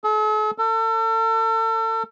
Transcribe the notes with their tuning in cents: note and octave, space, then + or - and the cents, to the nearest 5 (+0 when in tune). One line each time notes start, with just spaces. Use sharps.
A4 -45
A4 +35